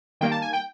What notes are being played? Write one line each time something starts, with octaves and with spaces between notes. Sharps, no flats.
D#3 G3 A#3 G5
A5
G#5
G5